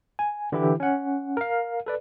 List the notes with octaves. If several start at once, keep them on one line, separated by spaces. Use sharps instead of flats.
G#5
D3 E3 E4 G4
C#4 F#5
A#4 F5
A4 B4 D5